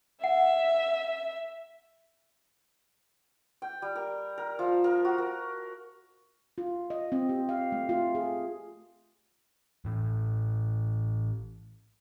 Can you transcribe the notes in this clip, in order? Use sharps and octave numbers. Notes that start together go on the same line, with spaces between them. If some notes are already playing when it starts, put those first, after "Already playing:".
E5 F#5
G5
G3
A#4
A#4
F3
A#4
F#4
A#4
F4
D#5
C4
G4
F5
A3
F4
G#4
A1 A2 A3